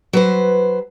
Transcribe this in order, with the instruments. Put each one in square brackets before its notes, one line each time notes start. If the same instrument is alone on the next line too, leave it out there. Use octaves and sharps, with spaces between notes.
[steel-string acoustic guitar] F#3 B4 C5